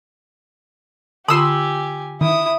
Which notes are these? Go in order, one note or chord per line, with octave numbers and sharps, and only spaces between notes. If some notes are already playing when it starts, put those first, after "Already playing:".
D3 F4 G4 G#5 B5 C6 D#6 E6
D#3 E4 D#6